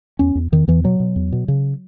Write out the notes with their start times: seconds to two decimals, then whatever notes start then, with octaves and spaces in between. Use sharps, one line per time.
0.19 E2 C#4
0.35 E2
0.52 E2 D#3
0.68 E2 E3
0.84 B2 F#3
1.00 B2
1.16 E2
1.32 B2
1.48 C#3